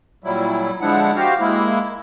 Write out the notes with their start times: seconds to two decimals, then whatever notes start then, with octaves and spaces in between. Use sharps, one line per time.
0.24 A#2 F#3 G3 E4
0.81 D3 F3 G#3 D4 E4 F#5
1.16 C4 F#4 G4 F5
1.40 G#3 A#3 E4